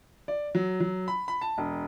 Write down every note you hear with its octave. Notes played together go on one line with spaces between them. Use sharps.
D5
F#3
F#3
B5
B5
A5
E1